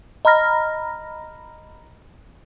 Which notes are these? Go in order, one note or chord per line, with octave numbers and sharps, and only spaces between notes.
D#5 A#5 B5 F6 A#6